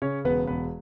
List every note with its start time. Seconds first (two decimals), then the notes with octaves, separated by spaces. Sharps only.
0.02 C#3 C#4 C#5
0.25 E1 B3 B4
0.47 E1 B3 B4